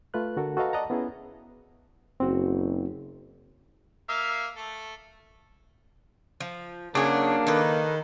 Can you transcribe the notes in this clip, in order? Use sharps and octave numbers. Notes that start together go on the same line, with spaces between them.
A3 F4 B4 F#6
D3 F#4 A4 A#4
F#4 A4 B4 D#5 F5 A#5
D5 D#5 F#5 A5 A#5
B3 C#4 E4 G#4
F#1 C4 F#4
A#3 E5 F5
A3 A4
F3
C#3 F#3 A#3 D4 G#4
D#3 D#4 A4 B4